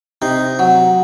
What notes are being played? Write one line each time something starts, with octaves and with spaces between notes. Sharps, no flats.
C3 D#4
F#3